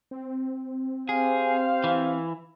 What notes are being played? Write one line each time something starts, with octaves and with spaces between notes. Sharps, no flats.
C4
G4 G#4 C5 F5
E3